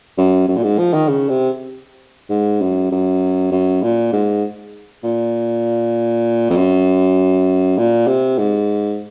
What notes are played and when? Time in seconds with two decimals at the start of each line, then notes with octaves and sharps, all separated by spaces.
0.18 F#2
0.48 F#2
0.56 A#2
0.63 G#2
0.79 F3
0.94 D#3
1.08 C#3
1.29 C3
2.30 G#2
2.61 F#2
2.91 F#2
3.51 F#2
3.83 A#2
4.13 G#2
5.04 A#2
6.50 F2
6.56 F#2
7.78 A#2
8.07 C3
8.38 G#2